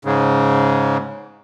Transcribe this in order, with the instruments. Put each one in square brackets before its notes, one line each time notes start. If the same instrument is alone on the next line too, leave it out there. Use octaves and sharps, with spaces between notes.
[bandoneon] G#2 C#3